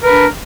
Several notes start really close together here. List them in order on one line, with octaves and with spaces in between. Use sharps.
A#4 B4 D4